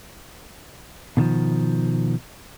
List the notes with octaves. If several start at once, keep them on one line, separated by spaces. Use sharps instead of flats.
B2 D3 D#3 F3